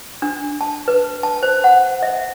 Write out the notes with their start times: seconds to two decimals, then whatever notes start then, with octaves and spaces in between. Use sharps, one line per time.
0.22 D4
0.61 A5
0.88 B4
1.23 A5
1.43 C5
1.64 F#5
2.03 E5